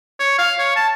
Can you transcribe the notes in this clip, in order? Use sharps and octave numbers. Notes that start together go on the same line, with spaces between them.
C#5
F5
C#5
A5